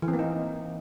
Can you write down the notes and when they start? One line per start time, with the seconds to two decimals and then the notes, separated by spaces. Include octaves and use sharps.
0.02 E3
0.08 C4
0.13 A#3
0.19 D#4